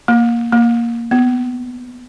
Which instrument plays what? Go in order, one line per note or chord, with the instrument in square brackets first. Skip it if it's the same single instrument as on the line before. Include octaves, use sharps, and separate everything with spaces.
[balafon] A#3
A#3
B3